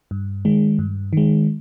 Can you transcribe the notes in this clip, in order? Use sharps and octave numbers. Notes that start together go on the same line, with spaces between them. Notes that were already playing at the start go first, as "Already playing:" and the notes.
G2
D#3 G#3
G2
D#3 G#3